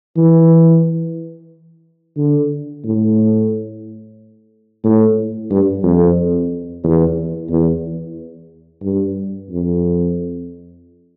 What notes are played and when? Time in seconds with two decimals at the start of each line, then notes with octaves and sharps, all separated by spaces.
0.17 E3
2.17 D3
2.84 A2
4.84 A2
5.51 G2
5.84 F2
6.84 E2
7.50 E2
8.83 G2
9.50 F2